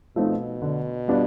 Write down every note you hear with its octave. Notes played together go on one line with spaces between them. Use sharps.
B2 F3 A3 C4 D#4
D3
G3 B3 D4 F4